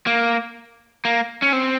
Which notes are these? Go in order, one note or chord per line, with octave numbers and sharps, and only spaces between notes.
A#3
A#3
C#4
C4